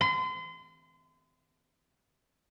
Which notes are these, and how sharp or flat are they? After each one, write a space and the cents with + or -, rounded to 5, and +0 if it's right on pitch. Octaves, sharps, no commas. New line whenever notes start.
C6 -35